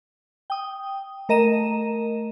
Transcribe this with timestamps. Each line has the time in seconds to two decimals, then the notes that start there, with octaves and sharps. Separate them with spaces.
0.50 G5 D#6
1.29 A3 A#4 D#5 A#5 D#7 E7